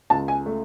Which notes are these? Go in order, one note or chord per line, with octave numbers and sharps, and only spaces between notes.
C#2 A5
G#5
A3